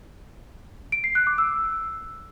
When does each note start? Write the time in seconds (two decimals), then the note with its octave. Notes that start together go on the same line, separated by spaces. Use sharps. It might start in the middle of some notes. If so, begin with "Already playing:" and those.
0.92 D7
1.04 C7
1.15 F#6
1.27 D6
1.38 E6